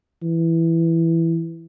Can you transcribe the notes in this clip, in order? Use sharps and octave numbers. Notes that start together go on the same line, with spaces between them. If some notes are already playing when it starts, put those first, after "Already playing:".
E3